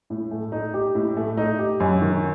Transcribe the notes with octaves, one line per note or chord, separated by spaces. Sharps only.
A2
A3
D#4
G4
A2
A3
D#4
G4
F#2
D#3